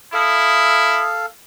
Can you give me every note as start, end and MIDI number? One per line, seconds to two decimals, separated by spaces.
0.13 1.03 64
0.13 1.26 69
0.13 1.26 77
0.13 1.08 87